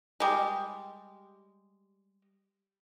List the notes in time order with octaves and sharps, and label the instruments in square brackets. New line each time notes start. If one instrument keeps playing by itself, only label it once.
[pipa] G3 G#3